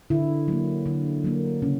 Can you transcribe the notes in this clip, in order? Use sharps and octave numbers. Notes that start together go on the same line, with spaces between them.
D3 E4
F#3 A#3
D3
F#3 A#3
C#3 C#4